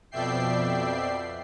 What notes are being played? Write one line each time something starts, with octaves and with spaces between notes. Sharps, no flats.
F2 B2 D5 E5 G5 C7